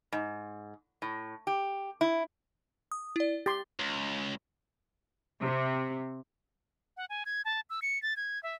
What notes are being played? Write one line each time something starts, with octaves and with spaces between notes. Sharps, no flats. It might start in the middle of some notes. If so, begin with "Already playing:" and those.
G#2
A2
G4
E4
D#6
E4 D5
G4 C6 A6
C#2
C3
F#5
G#5
G#6
A5
E6
C#7
A6
G#6
E5